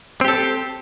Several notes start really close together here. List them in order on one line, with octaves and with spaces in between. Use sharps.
C4 G4 A4